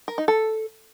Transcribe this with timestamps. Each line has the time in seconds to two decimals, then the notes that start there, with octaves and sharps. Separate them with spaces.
0.08 A#4
0.18 D#4
0.28 A4